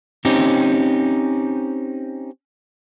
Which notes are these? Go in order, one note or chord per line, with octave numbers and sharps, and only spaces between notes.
C4 C#4 D#4 G4